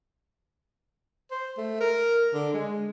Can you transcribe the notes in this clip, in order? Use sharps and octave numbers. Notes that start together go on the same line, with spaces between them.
C5
A3
A#4
D3
G#3